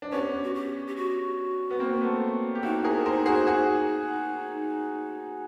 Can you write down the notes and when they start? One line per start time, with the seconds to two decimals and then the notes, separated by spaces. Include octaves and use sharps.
0.02 D4
0.12 B3 C#4 G4
0.44 F#4
0.54 G4
0.87 G4
0.96 F#4
1.71 B3
1.80 A#3 C4
2.01 A3 B3
2.55 G4
2.63 D#4 E4 F#4
2.84 G#4 A#4
3.05 A#4 C5
3.26 F#4 G#4
3.47 F#4 G#4